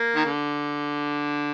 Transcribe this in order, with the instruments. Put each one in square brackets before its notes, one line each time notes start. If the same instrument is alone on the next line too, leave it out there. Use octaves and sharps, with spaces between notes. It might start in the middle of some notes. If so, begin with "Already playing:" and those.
Already playing: [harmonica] A#3
D#3
D3